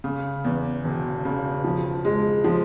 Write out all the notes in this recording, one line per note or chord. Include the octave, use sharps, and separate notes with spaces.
C#3
E2
E1
C#3
F3
G#3
F3